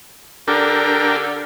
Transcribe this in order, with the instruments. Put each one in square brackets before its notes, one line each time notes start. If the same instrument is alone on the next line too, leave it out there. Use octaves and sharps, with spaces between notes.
[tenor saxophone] D3 [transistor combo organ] D4 G4 A#4